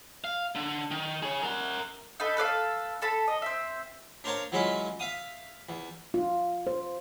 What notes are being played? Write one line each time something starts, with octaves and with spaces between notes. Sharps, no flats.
F5
D3
D#3
G#4 C#5
A#4 F#5
D#4 A4 B4
A4 B4 D5 F5
A4 A5 B5
D#5
C4 E5
D4 A#4 C5 C#5 F5 A#5
E3 F#3 G#3 C#4 E4 F4
E5 F5 D#6
E2
F4
C5